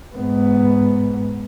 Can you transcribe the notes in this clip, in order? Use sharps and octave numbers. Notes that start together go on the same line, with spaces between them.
G#2 B3